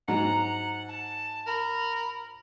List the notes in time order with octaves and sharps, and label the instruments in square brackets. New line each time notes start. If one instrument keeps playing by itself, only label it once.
[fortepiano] G#2 F#3 [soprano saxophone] F#5 [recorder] A#5
[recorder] A5
[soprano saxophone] A#4 [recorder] B5